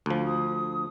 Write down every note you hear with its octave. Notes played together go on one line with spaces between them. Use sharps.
D2 F3
D#6